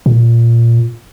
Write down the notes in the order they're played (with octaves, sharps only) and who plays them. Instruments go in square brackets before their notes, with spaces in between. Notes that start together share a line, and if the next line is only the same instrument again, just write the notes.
[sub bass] A#2